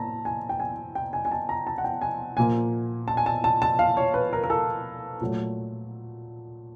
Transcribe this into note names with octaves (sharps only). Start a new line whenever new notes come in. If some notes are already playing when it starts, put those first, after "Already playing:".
Already playing: A2 A#3 A5 A#5
G#5
G5
G#5
G5
G#5
G#5
A5
A#5
A5
F#5
G5
G#5
A#2 F3 A#3 G#5
A5
G#5
A5
A5
A5
F5
C#5
B4
A#4
A#4
A4
A#2 F#3 A3